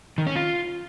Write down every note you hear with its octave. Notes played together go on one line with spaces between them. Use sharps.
D#3
C#4
F4